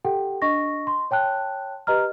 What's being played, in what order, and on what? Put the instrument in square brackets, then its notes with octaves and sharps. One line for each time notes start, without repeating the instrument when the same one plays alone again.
[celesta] G4 A4 F#5 G5
D4 D#5 C#6 A#6
C6
C#5 G5 A5 F#6
G4 B4 D#5 A#5 F6